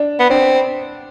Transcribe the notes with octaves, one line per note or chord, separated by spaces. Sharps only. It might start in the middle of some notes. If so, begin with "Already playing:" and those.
Already playing: D4
B3
C4 D4